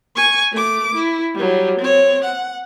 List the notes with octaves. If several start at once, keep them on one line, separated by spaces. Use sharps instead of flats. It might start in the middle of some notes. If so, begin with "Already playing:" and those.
G#5 C#6
A3 D6
E4
F#3 G3
C4 C#5
F#5